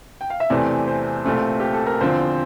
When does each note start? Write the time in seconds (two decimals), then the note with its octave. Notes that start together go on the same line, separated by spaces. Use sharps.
0.21 G5
0.30 F5
0.40 E5
0.50 E2 C3 E3 A3 C4 D5
0.87 C5
1.25 C2 A#2 A3 C4
1.60 G4
1.73 A4
1.86 A#4
2.01 E2 D3 F3 C4 C5